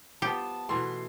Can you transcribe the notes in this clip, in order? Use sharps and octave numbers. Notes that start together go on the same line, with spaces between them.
F3 B3 G4 A5
B2 E3 A3 C6